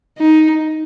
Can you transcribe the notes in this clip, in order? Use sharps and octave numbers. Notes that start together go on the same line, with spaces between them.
D#4